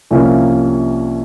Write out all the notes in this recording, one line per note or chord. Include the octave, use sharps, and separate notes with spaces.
C2 C3 F3 A#3 C#4